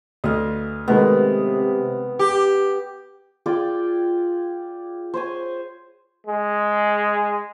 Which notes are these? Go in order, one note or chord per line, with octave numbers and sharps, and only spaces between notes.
D2 D#5 F5
C3 D#3 G#3 A3 B3
G4
F4 G#4 D5 G5
C5 C#5 G#5
G#3